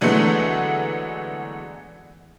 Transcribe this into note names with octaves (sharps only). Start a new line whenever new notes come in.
D3 E3 F#3 G#3 A3 B3